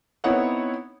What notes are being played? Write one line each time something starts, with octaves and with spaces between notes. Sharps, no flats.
B3 C4 D#4 E4 C#5 F#5